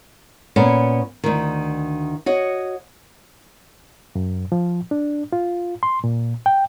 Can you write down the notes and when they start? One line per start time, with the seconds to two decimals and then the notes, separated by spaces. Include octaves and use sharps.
0.56 A#2 B3 C#4
1.24 D2 D#3
2.26 F#4 C#5 D#5
4.15 F#2
4.52 F3
4.91 D4
5.33 F4
5.83 C6
6.04 A#2
6.46 G5